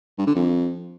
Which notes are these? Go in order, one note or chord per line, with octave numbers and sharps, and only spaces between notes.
G2
D3
F2